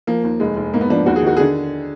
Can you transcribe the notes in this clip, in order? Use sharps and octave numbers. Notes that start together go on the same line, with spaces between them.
F3 A#3
D#2
F1 G#3
F1
G#2 A#3
B3
F3 D4
D#2 F#4
G#4
D#3 F#4
D3 G#4